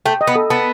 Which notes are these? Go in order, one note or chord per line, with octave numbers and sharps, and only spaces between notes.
A3 G5
D#5
B3
A4
B3 A5